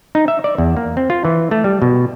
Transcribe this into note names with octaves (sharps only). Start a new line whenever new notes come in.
D#4
E5
D5
E2
A#3
C4
F4
E3
A3
G3
B2